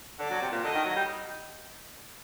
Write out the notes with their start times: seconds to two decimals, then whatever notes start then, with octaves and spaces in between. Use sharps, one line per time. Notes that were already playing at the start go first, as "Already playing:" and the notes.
0.19 D3 D5
0.30 F#3
0.42 C3
0.52 A#2
0.63 D3 D#5
0.74 D#3
0.85 F#3
0.96 G3